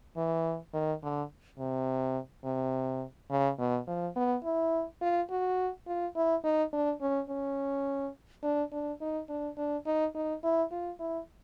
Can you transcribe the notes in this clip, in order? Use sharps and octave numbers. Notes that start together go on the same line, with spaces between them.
E3
D#3
D3
C3
C3
C#3
B2
F3
B3
E4
F4
F#4
F4
E4
D#4
D4
C#4
C#4
D4
D4
D#4
D4
D4
D#4
D#4
E4
F4
E4